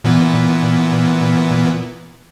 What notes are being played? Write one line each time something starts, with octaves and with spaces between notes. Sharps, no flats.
A#2 E3 B3